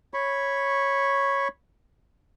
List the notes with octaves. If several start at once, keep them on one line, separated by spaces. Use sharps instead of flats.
C#5 B5 C#6